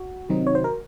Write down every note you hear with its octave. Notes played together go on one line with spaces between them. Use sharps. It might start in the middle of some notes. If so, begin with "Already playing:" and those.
Already playing: F#4
C3 D#3 F#3 C4 D#4
C#5
C5
A#4